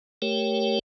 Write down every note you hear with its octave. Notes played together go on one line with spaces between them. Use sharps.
A3 G4 A#4 C#5 G5